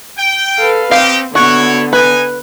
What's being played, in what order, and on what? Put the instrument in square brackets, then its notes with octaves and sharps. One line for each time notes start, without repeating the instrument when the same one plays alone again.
[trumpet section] G5
[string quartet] A4 B4 F5
[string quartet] C4 [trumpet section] D#4 G4 [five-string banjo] F5
[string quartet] D3 B3 [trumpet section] E4 C#5 [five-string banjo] F#4
[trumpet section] D#4 G#5 [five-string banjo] B4